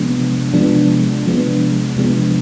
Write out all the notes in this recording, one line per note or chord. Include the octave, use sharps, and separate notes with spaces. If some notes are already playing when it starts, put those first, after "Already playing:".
Already playing: C3 F3 G#3 B3 D4
C3 F3 G#3 B3 D4
C3 F3 G#3 B3 D4
C3 F3 G#3 B3 D4